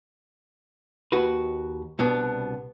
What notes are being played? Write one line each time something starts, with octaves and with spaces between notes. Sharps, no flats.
D#2 F#4 B4
C2 B2 B3 D4